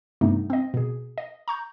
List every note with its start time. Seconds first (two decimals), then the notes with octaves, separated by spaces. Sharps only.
0.21 G2 C3 G3 A3 B3 D#4
0.50 C4 D#5
0.74 B2 G#4
1.18 D#5
1.48 A#5 C#6 G6